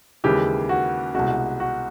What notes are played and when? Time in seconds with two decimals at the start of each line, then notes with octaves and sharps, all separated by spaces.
0.24 D#2 C#3 E3 G#3 G4
0.69 F#4
1.14 C2 B2 G#3 F#4
1.60 F#4